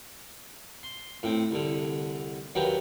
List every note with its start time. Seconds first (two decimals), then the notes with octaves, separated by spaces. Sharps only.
0.83 C6
1.23 A2 C4
1.51 C2 D3
2.55 D#2 F#3 D4 B4 G5 A#5